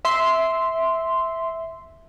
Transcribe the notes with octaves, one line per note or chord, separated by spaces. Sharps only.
E5 C6